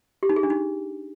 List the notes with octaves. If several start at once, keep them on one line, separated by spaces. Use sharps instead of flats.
G4
D#4
G#4
D4
D#4